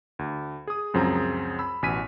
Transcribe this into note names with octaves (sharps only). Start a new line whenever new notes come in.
D2
G#4 D#6
C#2 F#2 F3 C4 G#4 A#5
B5 E6
A1 B2 G#5 B6 D#7